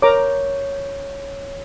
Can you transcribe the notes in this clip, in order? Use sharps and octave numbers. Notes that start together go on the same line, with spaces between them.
A#4 C#5 A#5 D6